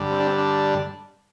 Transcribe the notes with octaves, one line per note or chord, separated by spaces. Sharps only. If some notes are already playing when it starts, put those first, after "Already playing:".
Already playing: G2 D3 G3
C4
D4
C4
D4